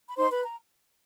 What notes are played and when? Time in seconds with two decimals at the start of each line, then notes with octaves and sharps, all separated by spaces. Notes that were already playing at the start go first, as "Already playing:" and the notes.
0.08 B5
0.17 D#4 C5 C6
0.30 B4 B5
0.44 A#5